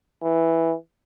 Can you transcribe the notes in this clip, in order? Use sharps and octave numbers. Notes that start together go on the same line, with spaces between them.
E3